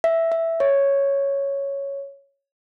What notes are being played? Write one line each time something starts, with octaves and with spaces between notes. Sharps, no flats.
E5
E5
C#5